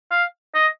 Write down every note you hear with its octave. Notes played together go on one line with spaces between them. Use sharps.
F5
D#5